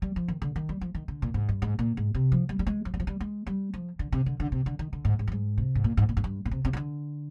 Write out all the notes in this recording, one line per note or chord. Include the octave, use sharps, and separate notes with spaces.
G3
F3
D#3
D3
D#3
G3
F3
D#3
D3
A#2
G#2
G2
G#2
A#2
G#2
C3
F3
G3
G3
G#3
F3
G3
F3
G3
G#3
G3
F3
D3
C3
D3
D3
C3
D3
D#3
D3
G#2
G#2
G2
G#2
C3
G#2
A#2
G#2
A#2
G#2
G2
A#2
C3
C3
D#3
D3